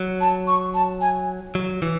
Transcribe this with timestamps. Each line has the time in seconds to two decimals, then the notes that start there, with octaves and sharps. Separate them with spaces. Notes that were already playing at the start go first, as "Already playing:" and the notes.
Already playing: F#3
0.21 A5
0.47 C#6
0.74 A5
1.01 G#5
1.55 F#3
1.82 E3